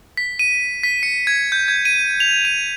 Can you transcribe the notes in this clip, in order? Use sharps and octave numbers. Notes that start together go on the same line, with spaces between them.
B6
D#7
B6
C#7
G#6
G6
G#6
D#7
F7
D#7